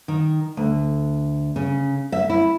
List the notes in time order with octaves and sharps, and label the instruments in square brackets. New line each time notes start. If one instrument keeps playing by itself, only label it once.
[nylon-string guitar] D#3
D2
C#3
E5
E4